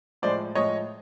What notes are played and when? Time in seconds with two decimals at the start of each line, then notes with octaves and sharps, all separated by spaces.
0.22 A2 F3 G#3 C5 D5
0.55 A2 F3 G#3 C#5 D#5